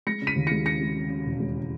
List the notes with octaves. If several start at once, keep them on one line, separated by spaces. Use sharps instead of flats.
G#3 A#6 C#7
C#3
B6 D#7
D#2
G#3 A#6 C#7
C#3 A#6 C#7
G#3
C#3
C#3
E1
G#3